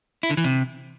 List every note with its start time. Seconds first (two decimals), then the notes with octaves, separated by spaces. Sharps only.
0.23 E4
0.30 D3
0.37 E3
0.44 C3